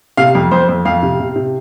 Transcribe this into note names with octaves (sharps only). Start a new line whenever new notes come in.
C3 F5
F2
F2 C5
F2
F2 F5
C3
C3
C3